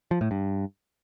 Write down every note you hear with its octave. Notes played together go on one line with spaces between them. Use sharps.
F3
A2
G2